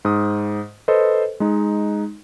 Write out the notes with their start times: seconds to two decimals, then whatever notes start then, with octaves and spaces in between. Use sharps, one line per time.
0.05 G#2 D#6
0.88 A4 B4 C5 D#5
1.40 G#3 D#4